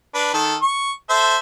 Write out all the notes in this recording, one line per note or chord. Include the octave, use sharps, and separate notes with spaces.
D4 B4
D#3 A4
C#6
A4 C5 E5